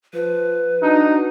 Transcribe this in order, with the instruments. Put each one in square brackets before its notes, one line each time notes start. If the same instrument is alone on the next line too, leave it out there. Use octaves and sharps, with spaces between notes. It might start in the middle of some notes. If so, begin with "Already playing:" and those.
[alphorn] F3 [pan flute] B4
[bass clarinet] D4 [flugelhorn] D#4 [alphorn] F#4